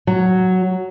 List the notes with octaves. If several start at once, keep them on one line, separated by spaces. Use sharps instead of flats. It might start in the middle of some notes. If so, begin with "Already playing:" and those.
F#3